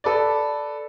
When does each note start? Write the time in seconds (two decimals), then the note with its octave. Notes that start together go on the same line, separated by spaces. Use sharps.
0.04 A4 B4 D5